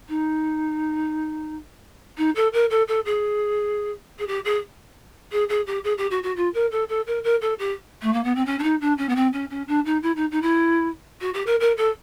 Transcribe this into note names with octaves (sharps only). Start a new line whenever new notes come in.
D#4
D#4
A4
A#4
A4
A4
G#4
G#4
G4
G#4
G#4
G#4
G4
G#4
G4
F#4
F#4
F4
A#4
A4
A4
A#4
A#4
A4
G4
A3
A#3
B3
C4
C#4
D4
D#4
D4
C#4
B3
C4
C#4
C#4
D4
D#4
E4
D#4
D#4
E4
F#4
G4
A#4
A#4
A4